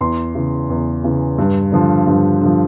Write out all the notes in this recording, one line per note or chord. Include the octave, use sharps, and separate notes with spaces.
E2 C6
C#3 E3
E2
C#3 E3
G2
D3 F3
G2
D3 F3